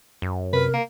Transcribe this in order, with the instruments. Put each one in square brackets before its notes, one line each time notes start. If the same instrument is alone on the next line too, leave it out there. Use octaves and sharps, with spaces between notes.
[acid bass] F#2
[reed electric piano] C3 [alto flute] A#4 [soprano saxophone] B4
[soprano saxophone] A#3